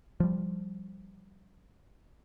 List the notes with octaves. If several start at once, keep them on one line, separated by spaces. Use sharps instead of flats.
F3 G3